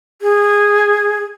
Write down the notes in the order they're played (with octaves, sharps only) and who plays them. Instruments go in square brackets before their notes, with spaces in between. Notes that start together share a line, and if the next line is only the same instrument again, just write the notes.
[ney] G#4